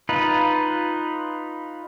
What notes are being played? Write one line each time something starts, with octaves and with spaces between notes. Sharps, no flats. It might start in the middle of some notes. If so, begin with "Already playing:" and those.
D#4 F4 B4